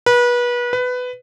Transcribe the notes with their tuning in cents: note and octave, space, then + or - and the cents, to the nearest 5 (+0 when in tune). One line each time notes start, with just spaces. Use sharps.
B4 -30
B4 +15